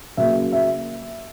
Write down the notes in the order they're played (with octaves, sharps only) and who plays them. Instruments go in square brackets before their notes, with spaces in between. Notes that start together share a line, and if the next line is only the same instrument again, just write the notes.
[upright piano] C#3 F#3 A#3 E5
E5